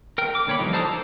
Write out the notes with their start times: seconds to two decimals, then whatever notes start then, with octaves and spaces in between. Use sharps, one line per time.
0.18 A#4 G5
0.35 D6
0.47 D3 A#3 C#5 G5 B5
0.59 E3 F3 G3 D#4
0.73 A4 C5 A5 A#5 D#6
0.85 A4